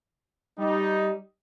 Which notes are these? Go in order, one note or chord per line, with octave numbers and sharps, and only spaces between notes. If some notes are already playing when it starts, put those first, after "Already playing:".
G3 D#4